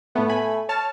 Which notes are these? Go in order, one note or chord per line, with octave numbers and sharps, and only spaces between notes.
A2 A3 B3
G#5 B5
C#5 A5 F6